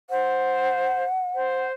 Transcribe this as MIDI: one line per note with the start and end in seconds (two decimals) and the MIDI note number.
0.10 1.04 72
0.10 1.67 78
1.35 1.72 72